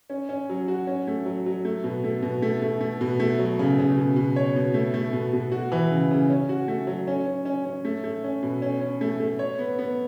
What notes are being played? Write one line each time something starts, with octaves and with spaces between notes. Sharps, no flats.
C#4
C#4
F#3
F#4
C#4
A3
F#3
F#3
A3
B2
A3
B2
A3
A3
A3
B2
A3
F#3
C#3
C#3
B2
B2
C#5
B2
A3
A3
B2
B2
F#4
E3
C#3
C#3
C#4
F#4
A3
F#3
C#4
C#4
C#4
C#4
A3
A3
C#4
B2
C#4
C#4
A3
A3
C#5
B3
B3